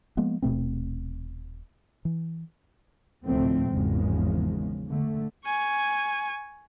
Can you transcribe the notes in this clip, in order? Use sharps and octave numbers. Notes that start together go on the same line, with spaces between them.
F3 G#3 A#3 B3
D#1 B2 A3 C4
E3
F1 D2 A2 F3 A3 C4
G#1 E2 C#3 F3 G#3
D3 A3
G#5 C#6